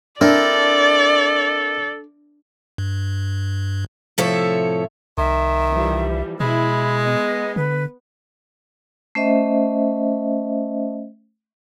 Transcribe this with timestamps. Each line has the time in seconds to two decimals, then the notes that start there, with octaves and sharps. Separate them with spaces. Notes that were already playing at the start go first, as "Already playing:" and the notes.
0.21 C4 D4 E4 A4 A#4 D5
2.78 G2
4.18 A2 C3 F3 A4 C#5 E5
5.18 C2 D#3 E5
5.71 E3 F3 G3
6.40 B2 G#3 E4 B5
7.05 B3 D#5
7.56 D3 B4
9.15 A3 C#4 C5 D#5 E5